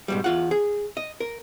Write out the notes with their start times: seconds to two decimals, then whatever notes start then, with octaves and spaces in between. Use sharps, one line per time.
0.08 G#2 B2 G3
0.24 E2 F4 F#5
0.51 G#4
0.97 D#5
1.20 A#4